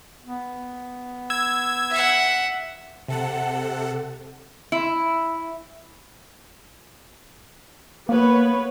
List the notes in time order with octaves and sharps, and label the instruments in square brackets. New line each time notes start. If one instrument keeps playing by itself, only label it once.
[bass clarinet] B3
[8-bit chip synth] E6 G#6
[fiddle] E5 F#5
[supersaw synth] C3 A4 F#5
[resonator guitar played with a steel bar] E4
[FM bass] A#3 [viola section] B3 B4 C#5